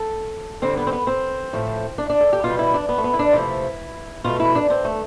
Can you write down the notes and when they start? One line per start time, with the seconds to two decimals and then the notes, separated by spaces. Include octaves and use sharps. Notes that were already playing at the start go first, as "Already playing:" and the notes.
Already playing: A4
0.62 D3 G3 C4
0.77 B3
0.87 C4
0.93 B3
1.07 C4
1.53 A2 F3 A3
1.98 D4
2.10 D4
2.21 A4
2.33 G4
2.43 B2 G3 F4
2.59 E4
2.74 D4
2.89 B3
2.98 A3
3.04 B3
3.13 E4
3.19 D4
3.34 C3 F3 A3 E4
4.24 B2 A3 F4
4.40 E4
4.55 D4
4.70 C4
4.85 A3